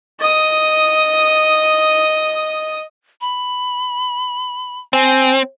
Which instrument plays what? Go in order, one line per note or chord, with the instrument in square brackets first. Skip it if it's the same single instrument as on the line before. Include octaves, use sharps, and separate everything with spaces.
[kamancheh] D#5 D#6
[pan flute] B5
[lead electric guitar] C4 [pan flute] G#5